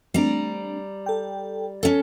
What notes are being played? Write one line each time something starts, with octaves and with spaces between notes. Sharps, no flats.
G3 A3 C4 D4 A#5
A4 G5
C#4 A4